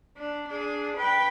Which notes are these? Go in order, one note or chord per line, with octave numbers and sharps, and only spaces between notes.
D4
D4 G#4
B4 G5